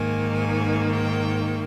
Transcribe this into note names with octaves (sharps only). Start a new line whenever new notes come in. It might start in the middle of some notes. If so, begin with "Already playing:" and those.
Already playing: G#2 D#3 A#3 G#5
G#5
G5